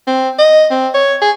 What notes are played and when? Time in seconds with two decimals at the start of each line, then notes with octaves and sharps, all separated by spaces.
0.08 C4
0.39 D#5
0.71 C4
0.94 C#5
1.22 G#4